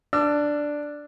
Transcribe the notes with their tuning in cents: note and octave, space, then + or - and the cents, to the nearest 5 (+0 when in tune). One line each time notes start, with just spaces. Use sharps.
D4 +0 E6 +45